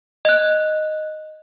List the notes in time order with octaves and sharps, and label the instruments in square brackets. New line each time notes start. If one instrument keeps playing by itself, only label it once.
[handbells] D#5 F#6